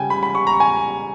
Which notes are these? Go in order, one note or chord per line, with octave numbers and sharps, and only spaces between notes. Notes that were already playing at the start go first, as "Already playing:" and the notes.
Already playing: C#3 G3 G5 G#5
B5
B5
C#6
A#5
G#5